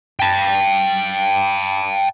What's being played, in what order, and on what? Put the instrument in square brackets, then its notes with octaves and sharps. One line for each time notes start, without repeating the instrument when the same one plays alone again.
[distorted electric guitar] G5 A5